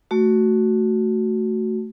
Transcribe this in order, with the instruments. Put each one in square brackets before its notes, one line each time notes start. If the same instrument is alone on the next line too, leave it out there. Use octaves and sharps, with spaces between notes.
[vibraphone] A3 F#4